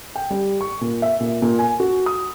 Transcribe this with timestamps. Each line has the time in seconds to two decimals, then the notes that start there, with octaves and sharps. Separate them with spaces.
0.16 G5
0.30 G3
0.61 C#6
0.81 A#2
1.02 E5
1.20 A#2
1.42 A#2
1.59 G#5
1.80 F#4
2.06 D#6